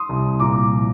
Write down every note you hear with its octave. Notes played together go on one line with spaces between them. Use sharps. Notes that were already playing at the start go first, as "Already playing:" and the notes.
Already playing: C6 D#6
C2
A#2 A#5 D6
F3